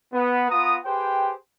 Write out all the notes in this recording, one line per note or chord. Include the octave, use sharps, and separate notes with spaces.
B3
B3 F4 A#5 D#6
G4 G#4 B4 C5 G5